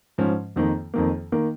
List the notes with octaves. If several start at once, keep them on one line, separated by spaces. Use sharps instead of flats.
G#2 F3 C#4
F2 D#3 A#3
F2 D#3 A#3
D#3 A#3